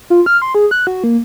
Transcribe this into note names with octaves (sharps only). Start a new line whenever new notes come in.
F4
F6
C6
G#4
F#6
F#4
A#3